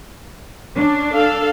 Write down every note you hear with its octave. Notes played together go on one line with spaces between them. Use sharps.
C#4 D4
A4 F5